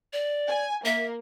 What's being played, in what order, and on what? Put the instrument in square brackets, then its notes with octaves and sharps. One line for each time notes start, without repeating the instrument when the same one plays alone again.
[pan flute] D5
[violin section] G#5
[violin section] A#3 [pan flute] E5